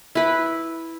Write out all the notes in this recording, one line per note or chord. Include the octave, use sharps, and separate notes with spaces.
E4 B4